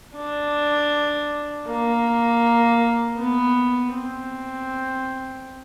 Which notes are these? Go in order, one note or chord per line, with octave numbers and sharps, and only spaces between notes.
D4
A#3
B3
C4